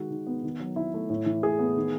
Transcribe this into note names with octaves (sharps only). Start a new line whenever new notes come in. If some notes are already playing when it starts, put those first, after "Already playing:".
Already playing: D#3 G#3 F#4
D#3
B3
D#3
F#3
D#3 E4
A3
A2
E3
A2 G#4
B3
D#3